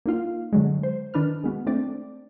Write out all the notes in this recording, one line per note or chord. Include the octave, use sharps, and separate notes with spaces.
A#3 D#4 F4 F5
D3 F#3 G#3
C5
D#3 D4 B4 F6
G#3 B3 F#4
A3 C4 D4 D5